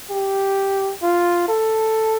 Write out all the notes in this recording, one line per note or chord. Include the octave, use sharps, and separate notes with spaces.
G4
F4
A4